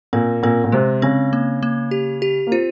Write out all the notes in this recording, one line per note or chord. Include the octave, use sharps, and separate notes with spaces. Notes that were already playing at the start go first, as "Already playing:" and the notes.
A#2 C4
A#2 C4
A#2
C3 G#3
C#3 C4
A#3
A#3
G4
G4
A#3
C4 F4